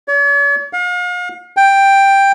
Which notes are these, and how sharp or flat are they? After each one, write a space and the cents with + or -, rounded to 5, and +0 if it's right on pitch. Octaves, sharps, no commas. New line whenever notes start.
C#5 +45
F5 +40
G5 +5